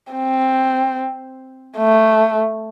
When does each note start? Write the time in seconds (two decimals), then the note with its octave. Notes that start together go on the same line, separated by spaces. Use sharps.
0.12 C4
1.78 A3